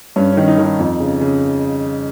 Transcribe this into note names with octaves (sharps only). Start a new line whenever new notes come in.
G2 C#4
D#3 C#4
D#4
D#3
D#4
F2
C#3
C#3